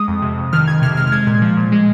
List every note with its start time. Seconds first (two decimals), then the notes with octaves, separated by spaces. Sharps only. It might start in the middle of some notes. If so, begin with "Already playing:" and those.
Already playing: G#3 D#6
0.08 F2
0.22 C3
0.38 F2
0.53 D#3 F6
0.67 F2 G#6
0.82 C3 F6
0.97 G#3 F6
1.07 F6
1.12 G#3 G#6
1.27 A#2
1.42 F3
1.57 A#2
1.72 G#3